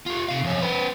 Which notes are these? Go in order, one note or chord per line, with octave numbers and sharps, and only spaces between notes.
F4 G4
C3 F5
F2 C#4
C4 B4